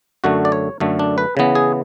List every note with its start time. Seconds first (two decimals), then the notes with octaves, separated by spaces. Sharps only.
0.24 F#2 D3 A3 F#4
0.45 D5
0.52 C#5
0.80 F#2 D3 A3
0.99 D4
1.18 B4
1.37 C#3 E3 B3
1.55 G#4